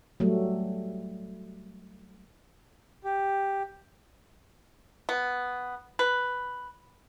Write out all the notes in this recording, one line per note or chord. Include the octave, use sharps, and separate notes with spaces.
F#3 G3 A3
G4
B3
B4